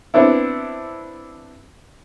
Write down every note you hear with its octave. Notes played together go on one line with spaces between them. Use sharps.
B3 C4 D4 E4